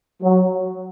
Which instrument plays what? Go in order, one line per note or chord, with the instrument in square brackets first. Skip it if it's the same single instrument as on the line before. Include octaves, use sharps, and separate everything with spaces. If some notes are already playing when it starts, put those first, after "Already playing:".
[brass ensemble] F#3